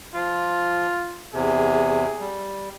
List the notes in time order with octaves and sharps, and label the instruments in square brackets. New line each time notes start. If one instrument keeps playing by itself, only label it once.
[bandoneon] F3 [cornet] F4
[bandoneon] E2 C3 [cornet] G#4
[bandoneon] G3